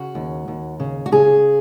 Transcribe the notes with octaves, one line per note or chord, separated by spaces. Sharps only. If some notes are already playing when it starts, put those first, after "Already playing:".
Already playing: C#3 F#4
D#2
D#2
C#3
F#4
C#3 G#4